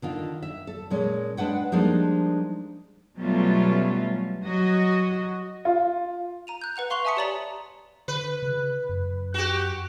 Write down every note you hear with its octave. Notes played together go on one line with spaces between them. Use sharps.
D3 D#3 F4
E5
A4
A#2 G#3 C#4
G#3 D4 B4 F#5 G5
F3 G3 G#3 A#3 D4 D#4
B2 F#3 G3 A3 C#4 F4
F#3 F#4 D#5
F4
A#5 D#7 F7
F#6 G6
B4 F#5 F#6 F7
F5 C6 C#6 F7 G7
E5 G#5 A5 D#6 B6 C#7
G4 C#5 D5 A#5 F#7
D3 B4
C#3
F#2
F#4 G4